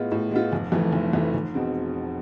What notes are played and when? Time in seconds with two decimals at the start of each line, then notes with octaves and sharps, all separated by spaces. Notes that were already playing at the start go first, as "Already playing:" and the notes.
Already playing: A2 G#3 B3 F4
0.12 A2
0.31 G#3 B3 F4
0.52 F1
0.72 F2 E3 A3
0.92 F1
1.13 F2 E3 A3
1.34 F1
1.54 B2 G#3 C4